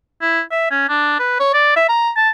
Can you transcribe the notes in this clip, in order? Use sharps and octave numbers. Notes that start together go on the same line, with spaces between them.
E4
E5
C#4
D4
B4
C#5
D5
E5
A#5
A5